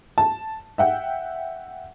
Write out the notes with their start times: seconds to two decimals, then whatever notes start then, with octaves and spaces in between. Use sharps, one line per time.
0.18 A5
0.78 E5 F#5 G5